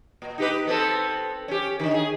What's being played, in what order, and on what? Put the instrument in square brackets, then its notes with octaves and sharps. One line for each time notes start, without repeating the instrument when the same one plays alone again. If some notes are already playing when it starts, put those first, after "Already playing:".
[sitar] A#2
D#4 G4 B4
B3 C4 A4
C#4 G4
D3 D#3
G#4